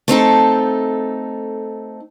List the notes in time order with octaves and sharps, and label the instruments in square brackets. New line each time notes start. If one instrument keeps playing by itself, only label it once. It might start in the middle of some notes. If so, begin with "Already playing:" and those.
[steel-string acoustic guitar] A3 C4 D#4 A4